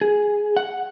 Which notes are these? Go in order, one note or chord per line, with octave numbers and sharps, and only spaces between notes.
G#4
F#5